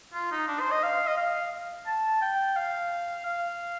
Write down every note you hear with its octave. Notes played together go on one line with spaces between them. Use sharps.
F4
D#4
D4
C5
D#5
F5
D#5
F5
A5
G5
F5
F5